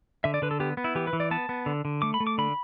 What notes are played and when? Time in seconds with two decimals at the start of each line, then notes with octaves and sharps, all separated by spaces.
0.24 D3 E5
0.34 D5
0.42 D3 B4
0.51 A4
0.60 B3 G4
0.77 B3
0.84 E4
0.95 E3 G4
1.07 B4
1.13 E3
1.20 D5
1.31 B3 A5
1.49 B3
1.66 D3
1.85 D3
2.02 A3 D6
2.14 B5
2.20 A3
2.27 D6
2.38 D3 B5